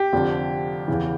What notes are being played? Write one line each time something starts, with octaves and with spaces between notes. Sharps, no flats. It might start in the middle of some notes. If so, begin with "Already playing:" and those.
Already playing: G4
F1 F2 D3 F3
E2 C#3 E3